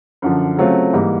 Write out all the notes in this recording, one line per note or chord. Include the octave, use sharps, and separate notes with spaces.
F#2 D3 F3
C#3 F#3 A3 C4 F4
G#2 E3 G3 A#3